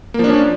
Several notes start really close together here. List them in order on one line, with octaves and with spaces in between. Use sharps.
A#3 F3 D4 C#4